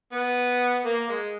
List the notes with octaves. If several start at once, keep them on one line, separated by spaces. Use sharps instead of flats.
B3
A#3
G#3